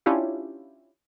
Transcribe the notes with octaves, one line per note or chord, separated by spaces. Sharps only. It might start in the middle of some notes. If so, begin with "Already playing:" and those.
C#4 D4 E4 F4 G4